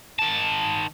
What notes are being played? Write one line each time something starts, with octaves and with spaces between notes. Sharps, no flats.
D#3 A5